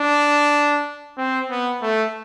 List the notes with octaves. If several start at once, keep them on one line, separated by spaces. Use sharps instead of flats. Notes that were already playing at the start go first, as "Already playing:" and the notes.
Already playing: D4
C4
B3
A3